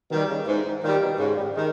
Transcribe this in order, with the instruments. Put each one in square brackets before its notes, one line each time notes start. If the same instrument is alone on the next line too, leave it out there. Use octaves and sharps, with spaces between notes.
[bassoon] B2 [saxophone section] D#3
[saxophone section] G3
[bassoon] C#3
[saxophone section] G#2 [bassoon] E3
[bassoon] A#2 [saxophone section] D#3
[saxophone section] G3
[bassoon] B2
[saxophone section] G#2 [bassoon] C#3
[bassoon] G3
[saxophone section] D#3 [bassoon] G#3